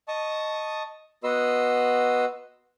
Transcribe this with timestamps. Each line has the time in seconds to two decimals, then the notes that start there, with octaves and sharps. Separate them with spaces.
0.08 D#5 A5 C#6 D#6
1.23 B3 F#4 B4 D#5 C6 E6